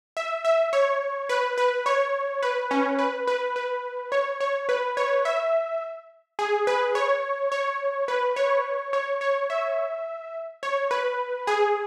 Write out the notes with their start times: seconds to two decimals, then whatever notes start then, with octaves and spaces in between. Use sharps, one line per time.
0.17 E5
0.45 E5
0.73 C#5
1.29 B4
1.58 B4
1.86 C#5
2.43 B4
2.71 C#4
2.99 B4
3.27 B4
3.56 B4
4.12 C#5
4.40 C#5
4.69 B4
4.97 C#5
5.25 E5
6.39 G#4
6.67 B4
6.95 C#5
7.52 C#5
8.08 B4
8.36 C#5
8.93 C#5
9.21 C#5
9.50 E5
10.63 C#5
10.91 B4
11.47 G#4